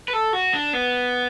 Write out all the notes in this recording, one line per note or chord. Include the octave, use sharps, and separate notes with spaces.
B4
A4
F#4
D4
B3